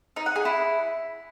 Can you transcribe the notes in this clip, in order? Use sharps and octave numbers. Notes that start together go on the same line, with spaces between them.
D#4
F#5
G#4
E4